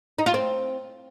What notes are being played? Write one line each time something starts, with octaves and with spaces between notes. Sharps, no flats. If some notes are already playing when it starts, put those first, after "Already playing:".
D#4
F4
C4